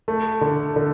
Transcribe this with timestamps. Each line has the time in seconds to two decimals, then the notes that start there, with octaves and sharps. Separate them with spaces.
0.08 A3
0.41 D3
0.76 D3